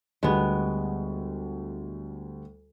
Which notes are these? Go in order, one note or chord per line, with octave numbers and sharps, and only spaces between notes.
D2 G3 G#3 B3